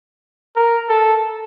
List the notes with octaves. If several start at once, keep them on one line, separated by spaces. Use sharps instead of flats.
A#4
A4